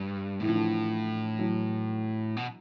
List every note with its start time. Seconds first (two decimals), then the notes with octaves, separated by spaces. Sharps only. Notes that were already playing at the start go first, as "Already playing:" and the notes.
Already playing: G2
0.40 A2 E3
0.48 F3
0.55 D3 E3
1.39 E3 F#3
2.37 B2